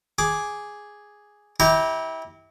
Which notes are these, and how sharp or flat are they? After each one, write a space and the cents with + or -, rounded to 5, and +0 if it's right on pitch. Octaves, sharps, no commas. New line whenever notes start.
G#4 +0 D6 -5
E4 -30 G4 +0 A#5 -10